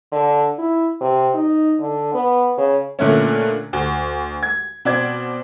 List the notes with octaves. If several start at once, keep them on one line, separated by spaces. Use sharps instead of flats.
D3
E4
C3
D#4
D3
B3
C#3
A#2 D3 A3 C#4
D2
G#6
B2 C4 D5 G#6